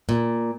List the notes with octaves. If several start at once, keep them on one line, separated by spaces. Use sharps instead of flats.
A#2